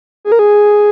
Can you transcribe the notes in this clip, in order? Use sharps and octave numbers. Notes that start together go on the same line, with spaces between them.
G#4
A#4
G#4